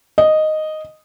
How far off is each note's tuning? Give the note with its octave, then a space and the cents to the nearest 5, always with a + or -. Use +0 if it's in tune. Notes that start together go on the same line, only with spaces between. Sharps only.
D#5 -5